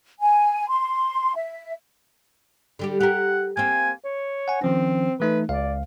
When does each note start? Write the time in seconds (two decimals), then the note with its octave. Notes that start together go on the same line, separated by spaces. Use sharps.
0.21 G#5
0.69 C6
1.36 E5
2.79 D3 G3 G4
3.00 G4 A#4 F#5
3.57 A#3 C4 G#5
4.05 C#5
4.48 F#5 G#5
4.62 D#3 F3 C4 C#4
5.20 E3 A3 D#4 B4
5.49 C#2 D5 F5